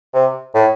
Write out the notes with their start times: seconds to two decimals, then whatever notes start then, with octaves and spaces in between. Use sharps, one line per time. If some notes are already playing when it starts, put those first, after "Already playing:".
0.14 C3
0.54 A2